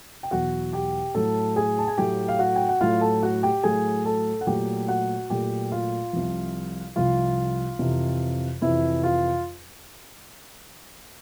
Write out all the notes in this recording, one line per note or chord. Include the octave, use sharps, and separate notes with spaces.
G5
E2 B2 F#3 F#4 F#5
G4 G5
A2 F#3 A3 A4 A5
G#4 G#5
A5
G#5
A2 F#3 A3 G4 G5
F5
F#4 F#5
G5
F#5
A2 F#3 A3 F4 F5
A4 A5
F#4 F#5
G4 G5
A2 F#3 A3 G#4 G#5
A4 A5
F#5
A#2 F#3 A3 G4 G5
F#4 F#5
A#2 F#3 A3 G4 G5
F4 F5
C2 C3 F3
C2 C3 F3 F4 F5
F2 C3 E3
F2 C3 E3 E4 E5
F4 F5